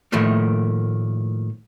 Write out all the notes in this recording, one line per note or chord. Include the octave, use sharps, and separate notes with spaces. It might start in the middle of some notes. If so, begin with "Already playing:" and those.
A2 D#3 F3 A3 A#3